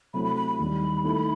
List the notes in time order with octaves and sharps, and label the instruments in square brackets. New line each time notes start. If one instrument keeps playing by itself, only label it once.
[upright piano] C3 F#3 A3 E4 [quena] B5
[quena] B5
B5
B5
[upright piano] D#2 D#3 G3
D#3 A3 E4 A4